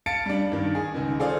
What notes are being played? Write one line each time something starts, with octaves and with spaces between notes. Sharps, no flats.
F5 A5 A6 C#7 D7
G3 D4
G2 D#3
G#4
C#2 D#3
F4 G#4 A4 C5 D5 F5